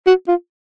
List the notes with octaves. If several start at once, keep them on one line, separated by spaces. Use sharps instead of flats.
F#4
F4